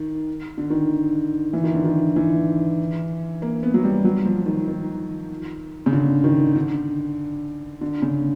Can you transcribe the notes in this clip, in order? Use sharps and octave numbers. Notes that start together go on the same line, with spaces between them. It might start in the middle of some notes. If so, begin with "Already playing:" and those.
Already playing: D#3
D3
D#3
E3
D#3
D3
D#3
E3
A#3
B3
F#3
G3
F#3
F3
D#3
D#3
C#3
D3
D#3
D3
D3
C#3